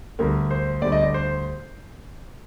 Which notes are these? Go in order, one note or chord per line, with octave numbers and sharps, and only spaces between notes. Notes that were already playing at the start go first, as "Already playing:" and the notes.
D2 D3 G3 A#4
C5
D2 D3 G3 D5
D#5
D5
C5